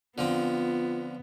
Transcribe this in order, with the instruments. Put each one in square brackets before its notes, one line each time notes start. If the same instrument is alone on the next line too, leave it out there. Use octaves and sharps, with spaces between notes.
[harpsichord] D3 F3 C4 [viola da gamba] B3 [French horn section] F4